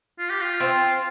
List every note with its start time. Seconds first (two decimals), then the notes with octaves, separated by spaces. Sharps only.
0.19 F4
0.30 G4
0.41 F4
0.60 C4